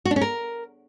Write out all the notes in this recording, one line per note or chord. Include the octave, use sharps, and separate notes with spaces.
F#4
D4
C#4
A#4